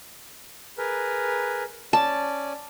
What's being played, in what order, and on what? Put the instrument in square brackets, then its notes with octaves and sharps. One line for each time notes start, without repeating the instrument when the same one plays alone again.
[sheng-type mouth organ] G#4 A#4 B4
[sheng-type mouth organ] C#4 D5 [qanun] A5